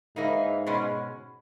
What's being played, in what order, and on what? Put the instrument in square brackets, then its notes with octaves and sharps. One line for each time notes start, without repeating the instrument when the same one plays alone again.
[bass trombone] G#2 [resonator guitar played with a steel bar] E3 A#3 D#4
[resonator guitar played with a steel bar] B2 G#3 C#4